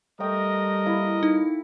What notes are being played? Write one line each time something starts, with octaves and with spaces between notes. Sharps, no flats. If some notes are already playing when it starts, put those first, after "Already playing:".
G3 A3 A#4 D#5 G5 D#6
A#3 E4
D#4